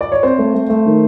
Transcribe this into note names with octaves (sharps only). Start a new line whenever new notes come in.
D5
C#5
C4 C5
A3
A3
A3
D#3